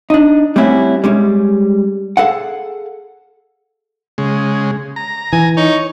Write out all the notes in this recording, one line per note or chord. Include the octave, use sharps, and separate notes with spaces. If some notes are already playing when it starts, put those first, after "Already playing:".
D4 D#4
G3 A3 C4 C#4 E4 F#4
G3 G#3 C#4
G#4 A4 F5 F#5
C#3 G#3
A#5
E3 G#5
D#4 C#5